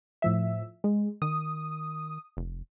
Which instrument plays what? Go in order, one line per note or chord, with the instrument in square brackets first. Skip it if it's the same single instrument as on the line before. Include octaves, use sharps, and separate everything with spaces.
[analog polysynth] A2 F3 E5
G#3
[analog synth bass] D#3 [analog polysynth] D#6
[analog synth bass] F1